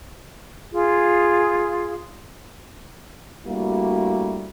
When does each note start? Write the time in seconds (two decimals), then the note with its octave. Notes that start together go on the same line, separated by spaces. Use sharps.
0.72 F4 G#4
3.47 G3 A3 A#3 D4 E4 F#4